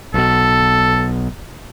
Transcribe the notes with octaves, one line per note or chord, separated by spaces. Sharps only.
B1 B2 A4